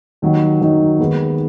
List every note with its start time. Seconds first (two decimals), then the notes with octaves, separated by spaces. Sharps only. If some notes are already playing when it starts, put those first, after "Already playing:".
0.22 D#2 D#3 F#3 D#4
0.61 D#2 D#3 F#3 D#4
0.99 D#2 D#3 G#3 B3